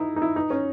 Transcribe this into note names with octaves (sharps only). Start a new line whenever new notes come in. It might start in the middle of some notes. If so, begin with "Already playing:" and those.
Already playing: D#4 E4
D#4
E4
D#4
C#4